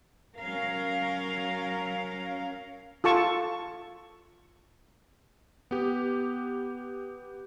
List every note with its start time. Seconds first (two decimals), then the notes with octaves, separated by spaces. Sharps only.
0.38 F#3 C#4 A#4 F5
3.04 F4 A4 A5 C#6
5.71 B3 G4